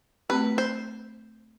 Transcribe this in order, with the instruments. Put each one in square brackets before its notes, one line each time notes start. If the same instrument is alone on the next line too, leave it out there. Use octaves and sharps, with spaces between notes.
[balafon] A3 C4 G4 [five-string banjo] B4
[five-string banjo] C5